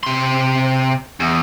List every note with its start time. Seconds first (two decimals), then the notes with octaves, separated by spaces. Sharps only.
0.03 C3 C6
1.20 E2